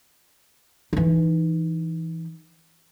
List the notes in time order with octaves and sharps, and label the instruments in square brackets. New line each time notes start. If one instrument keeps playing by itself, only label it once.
[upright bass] E3 D#4